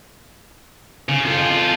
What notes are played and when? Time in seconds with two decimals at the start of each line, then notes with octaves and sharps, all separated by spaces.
1.09 C#3
1.26 F4 A4